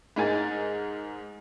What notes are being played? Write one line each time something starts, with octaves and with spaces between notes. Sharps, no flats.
G#2 D#4 A#4 G#5 A6